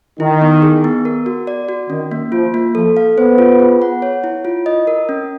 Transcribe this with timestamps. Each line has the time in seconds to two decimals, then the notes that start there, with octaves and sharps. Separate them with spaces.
0.20 D#3 E4
0.41 B3
0.62 G#4
0.84 B3
1.05 A#4
1.26 F#4
1.47 D5
1.69 F#4
1.90 D#3 C#4
2.11 A#3
2.32 F3 F4
2.54 A#3
2.75 F3 A4
2.97 F5
3.18 B3 C5
3.38 F4
3.60 G#4
3.82 F#5
4.02 C#5
4.24 E4
4.45 F4
4.66 D#5
4.87 A#4
5.09 C#4